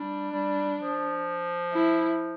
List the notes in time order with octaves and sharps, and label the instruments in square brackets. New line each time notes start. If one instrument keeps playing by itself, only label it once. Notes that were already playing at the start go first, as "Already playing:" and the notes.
Already playing: [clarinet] G3 [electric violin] D4
[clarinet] G3
F3
[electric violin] E4